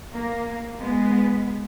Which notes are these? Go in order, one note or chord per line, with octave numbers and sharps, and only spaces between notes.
A#3
G#3 B3